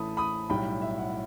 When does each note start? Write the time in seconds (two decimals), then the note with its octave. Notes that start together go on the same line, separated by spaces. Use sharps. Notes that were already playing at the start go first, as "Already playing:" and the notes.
Already playing: A1 A2 E3 A3 A5 B5 D#6
0.17 B5 D#6
0.50 B1 A2 G3 G5 B5
0.82 E5
0.98 F#5